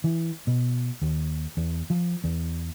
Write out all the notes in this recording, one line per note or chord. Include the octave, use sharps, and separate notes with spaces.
E3
B2
D#2
E2
F3
E2